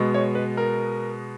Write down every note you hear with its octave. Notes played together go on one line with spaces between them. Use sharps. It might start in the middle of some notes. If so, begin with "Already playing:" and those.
Already playing: B2 G#3 B3
C#5
B4
A#4